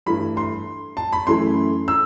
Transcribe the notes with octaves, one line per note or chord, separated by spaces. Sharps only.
G2 E3 A3 E4 B5
C6
A5
B5
F#2 E3 A3 E4 C6
E6